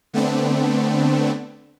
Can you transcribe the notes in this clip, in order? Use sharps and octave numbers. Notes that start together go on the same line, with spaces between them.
D3 A3 B3 C4 D4